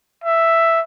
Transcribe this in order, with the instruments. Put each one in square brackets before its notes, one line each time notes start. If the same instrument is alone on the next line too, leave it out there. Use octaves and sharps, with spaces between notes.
[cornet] E5